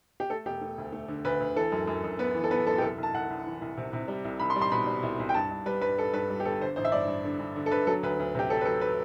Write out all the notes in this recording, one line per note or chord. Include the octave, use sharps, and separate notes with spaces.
G4
A3 A4
E1 G4
A3
D2
A3
D3
D2 B4
D2
E3 A4
F#2
F#2
F#2
B3 B4
E3
A4
B3 B4
F#2 A4
G4
C2 A4
C2
A5
C2 F#5
C2
E3
C2
C3
C3
G3
C2
C2 B5
C6
G3
C6
B2 B5
G3
C2
C2
G5
G2 A5
G2
G3 B4
G2 B4
G2 A4
G2 B4
G3
G4
G1 A4
D3 C5
A1 C5
E5
G2 D5
G2
D3
G2
D3
A4
D3 B4
F#3 A4
D2 B4
D2
C3 G4
F#3 A4
B4
F#3 A4
B4